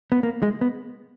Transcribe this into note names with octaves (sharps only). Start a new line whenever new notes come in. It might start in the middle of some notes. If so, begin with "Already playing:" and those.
B3
A#3
G#3
B3